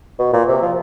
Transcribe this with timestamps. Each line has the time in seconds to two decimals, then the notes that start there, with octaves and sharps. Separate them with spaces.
0.19 B2
0.33 A#2
0.48 C3
0.62 F3